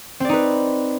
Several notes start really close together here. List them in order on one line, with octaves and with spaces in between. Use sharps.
C4 D5 D#4 B4